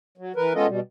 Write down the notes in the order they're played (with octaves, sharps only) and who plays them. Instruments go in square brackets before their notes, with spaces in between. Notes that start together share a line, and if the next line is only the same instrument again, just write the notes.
[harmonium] F#3
E3 A#4 B4
G#3 B3 C#4 F4 A4 D#5
B2 G3